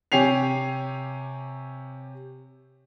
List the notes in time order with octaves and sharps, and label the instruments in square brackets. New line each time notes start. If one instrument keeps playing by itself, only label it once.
[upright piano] C3 G4 C#5 G#5 C7 F7